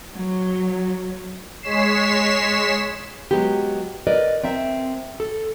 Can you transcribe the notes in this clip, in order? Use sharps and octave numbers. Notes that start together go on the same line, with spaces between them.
F#3
G#3 C#5 B6 C7 E7
F#3 G#3 B3 G4
A#4 B4 D5 D#5
C4 A#4 E5
A4